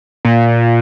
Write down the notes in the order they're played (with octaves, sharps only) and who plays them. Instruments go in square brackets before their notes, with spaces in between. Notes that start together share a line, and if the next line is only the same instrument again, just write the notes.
[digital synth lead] A#2